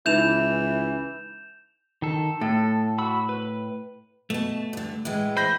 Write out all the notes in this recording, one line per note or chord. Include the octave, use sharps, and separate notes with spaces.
C#2 E3 D#4 E4 E5 G6 E7 F7
D#3 A4
A2 A4
F#4 B5 E6
B4
B2 A3 A5
G2 D3
A2 E3 G#3
C5 B5 G6 A#6